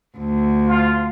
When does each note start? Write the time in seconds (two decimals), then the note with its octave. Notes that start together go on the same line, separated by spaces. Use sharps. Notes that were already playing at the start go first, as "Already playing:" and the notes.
0.18 D2
0.67 F4